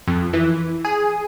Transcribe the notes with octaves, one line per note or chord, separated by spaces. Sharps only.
F2
E3
G#4